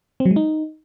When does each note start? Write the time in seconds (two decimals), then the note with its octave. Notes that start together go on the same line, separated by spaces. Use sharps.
0.20 C4
0.25 F#3
0.31 G#3
0.36 D#4